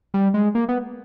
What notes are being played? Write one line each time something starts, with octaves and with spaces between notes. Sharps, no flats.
G3
G#3
A#3
B3